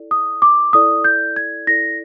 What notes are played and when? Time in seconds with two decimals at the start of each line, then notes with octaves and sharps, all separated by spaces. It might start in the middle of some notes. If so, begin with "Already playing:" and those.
Already playing: E4 A4 D5
0.11 D#6
0.42 D6
0.73 E4 A4 D5 D#6
1.04 G6
1.36 G#6
1.67 E4 A4 D5 A#6